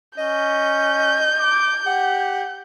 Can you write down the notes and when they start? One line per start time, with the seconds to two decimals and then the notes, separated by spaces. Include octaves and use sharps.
0.18 C#4 D#5 G6
1.38 D6
1.86 G4 F#5